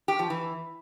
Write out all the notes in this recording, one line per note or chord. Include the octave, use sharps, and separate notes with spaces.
G4
F3
E3